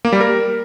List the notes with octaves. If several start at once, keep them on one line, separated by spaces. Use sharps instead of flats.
A#3
G3
A#4